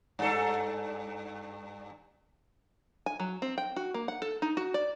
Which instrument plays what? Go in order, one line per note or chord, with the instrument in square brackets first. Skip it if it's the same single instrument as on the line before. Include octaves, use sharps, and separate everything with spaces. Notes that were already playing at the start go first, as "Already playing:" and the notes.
[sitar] G2 A4
[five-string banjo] G#5
F#3
C4
G5
F#4
A#3
F#5
A4
D#4
F#4
D5